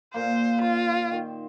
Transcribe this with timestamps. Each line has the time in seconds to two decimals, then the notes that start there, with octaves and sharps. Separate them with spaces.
0.14 A#2 A#3 C5
0.61 F4 C5
1.11 D#3